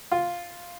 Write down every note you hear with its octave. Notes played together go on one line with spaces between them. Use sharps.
F4